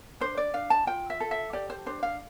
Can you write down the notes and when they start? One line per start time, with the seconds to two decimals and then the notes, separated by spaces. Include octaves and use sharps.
0.20 D4 C5
0.37 D5
0.54 D4 F5
0.70 A5
0.87 F4 G5
1.10 E5
1.20 A4
1.31 E5
1.53 G4 D5
1.70 C5
1.86 D4 C5
2.03 F5